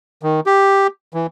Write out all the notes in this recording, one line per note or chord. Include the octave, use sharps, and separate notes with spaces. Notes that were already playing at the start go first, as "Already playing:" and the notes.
D#3
G4
E3